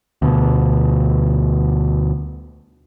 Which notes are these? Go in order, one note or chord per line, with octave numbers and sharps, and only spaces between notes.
D2 B2